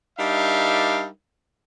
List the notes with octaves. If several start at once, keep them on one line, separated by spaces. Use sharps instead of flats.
G3 D4 D#4 A#4 E5 F5